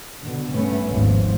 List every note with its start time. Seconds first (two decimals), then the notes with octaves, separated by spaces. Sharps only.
0.21 B2 D3
0.53 G2 A3 B3 C#4
0.89 G#1 D#2 G#2 F3